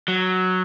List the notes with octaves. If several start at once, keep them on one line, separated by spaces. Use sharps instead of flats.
F#3